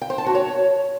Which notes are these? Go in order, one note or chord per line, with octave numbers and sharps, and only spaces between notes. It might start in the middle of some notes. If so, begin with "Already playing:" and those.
G5
C5
A5
F#4
C#5